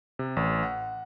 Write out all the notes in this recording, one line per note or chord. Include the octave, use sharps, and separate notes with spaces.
C3
A1
F#5